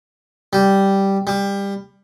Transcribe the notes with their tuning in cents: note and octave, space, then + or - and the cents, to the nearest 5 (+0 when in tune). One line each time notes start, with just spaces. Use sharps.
G3 -5
G3 +20